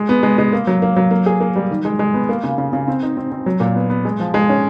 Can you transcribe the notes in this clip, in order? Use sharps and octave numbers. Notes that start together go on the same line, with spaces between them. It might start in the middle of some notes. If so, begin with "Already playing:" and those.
Already playing: G#3
B3
G#3
G#3
A#3
F#3
A#3
F#3
A#3
G#4
A#3
G3
D#3
G#3
G#3
B3
A#3
C#3
C#3
C#3
C4
D#4
C4
C4
F#3
A#2
B3
B3
G#3
F3
G#3
C#4